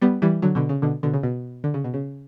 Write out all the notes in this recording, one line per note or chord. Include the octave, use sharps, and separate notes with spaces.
G3 B3
E3 G3
D3 F#3
B2 D3
C#3
B2 D3
B2 D3
C#3
B2
D3
C#3
B2
C#3